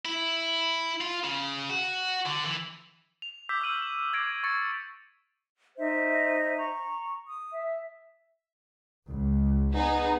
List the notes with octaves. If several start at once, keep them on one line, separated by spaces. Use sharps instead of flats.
E4
F4
C#3
F#4
D3
E3
F7
D6 E6 G6 B6
C#6 E6 F6 D#7 F#7
E7
D6 G#6 A#6 C7 D7
C#6 A6 C#7
D#4 C5 E5
A#5 C#6
D#6
E5
C#2
B3 D#4 G#4